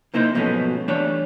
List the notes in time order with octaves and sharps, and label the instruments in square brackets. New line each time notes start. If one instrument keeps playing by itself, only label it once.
[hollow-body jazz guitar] C3 A#3 D#4 E4 C5
G#2 B2 F3 F#3 A3 C#4
E3 G3 A3 D4 C#5 D5